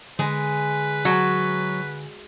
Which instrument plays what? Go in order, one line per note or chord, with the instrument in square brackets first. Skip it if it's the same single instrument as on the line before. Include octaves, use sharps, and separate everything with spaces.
[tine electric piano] D3 G#5 [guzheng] G#3 [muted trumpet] B4
[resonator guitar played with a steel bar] F#3